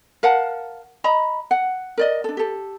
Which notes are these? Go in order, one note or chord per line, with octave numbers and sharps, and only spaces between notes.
A#4 F5 F#5 A5
D#5 A#5 B5
F#5
A#4 D5 D#5
D4 A4
G4 A4